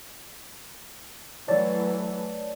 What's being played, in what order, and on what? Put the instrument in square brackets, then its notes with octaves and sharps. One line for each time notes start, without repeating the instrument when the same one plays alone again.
[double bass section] E3 F#3 A3 [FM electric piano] C#5 D5 A5